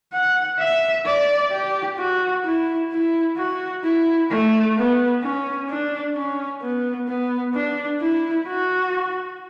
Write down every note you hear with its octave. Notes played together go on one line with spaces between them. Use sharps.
F#5
E5
D5
G4
F#4
E4
E4
F#4
E4
A3
B3
C#4
D4
C#4
B3
B3
D4
E4
F#4